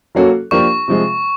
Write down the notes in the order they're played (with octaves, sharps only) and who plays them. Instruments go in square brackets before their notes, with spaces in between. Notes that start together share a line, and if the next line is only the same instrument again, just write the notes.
[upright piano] F#3 A#3 C#4 F#4 A4
[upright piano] F3 A#3 D4 G4 A#4 [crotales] C#6
[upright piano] C3 F3 G#3